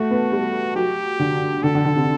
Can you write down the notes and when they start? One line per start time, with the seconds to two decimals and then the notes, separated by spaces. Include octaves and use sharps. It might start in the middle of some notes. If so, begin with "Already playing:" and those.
Already playing: A3 F#4
0.11 B3
0.32 G3
0.76 F#3 G4
1.19 D3
1.63 D3 A4
1.75 D3
1.85 D3
1.96 C3